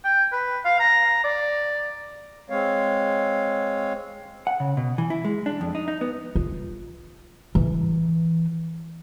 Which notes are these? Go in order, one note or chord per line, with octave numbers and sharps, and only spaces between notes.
G5
B4
F5
A#5
D5
G#3 C4 C#5 F5
F#5
C#3
B2
E3
E4
G#3
D4
F2
D#4
D#4
B3
F4
E3